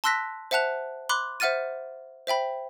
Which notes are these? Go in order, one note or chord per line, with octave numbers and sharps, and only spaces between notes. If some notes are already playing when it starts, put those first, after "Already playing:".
A5 C6 E6 F#6 A#6 B6
C5 E5 F#5 A5 F#6 F7
B5 C6 D6 F#6
C5 E5 F#5 F6 A6 D#7
C5 E5 G5 B5